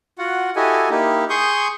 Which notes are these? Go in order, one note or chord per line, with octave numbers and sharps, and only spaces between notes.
F4 F#4 F#5
E4 F#4 G4 A4 D#5 G#5
A#3 D#4 E4 G4
G#4 C6 C#6 D#6 G6